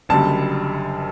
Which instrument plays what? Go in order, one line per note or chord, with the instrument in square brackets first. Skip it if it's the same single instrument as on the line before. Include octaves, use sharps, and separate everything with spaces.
[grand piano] F#1 F#2 D3 G3 A5